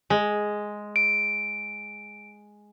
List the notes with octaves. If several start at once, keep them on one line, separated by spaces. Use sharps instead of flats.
G#3
D7